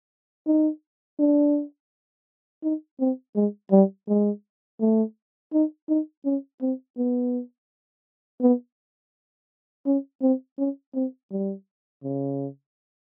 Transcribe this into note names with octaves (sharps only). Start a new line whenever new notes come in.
D#4
D4
D#4
C4
G#3
G3
G#3
A3
D#4
D#4
C#4
C4
B3
B3
C#4
C4
C#4
C4
G3
C#3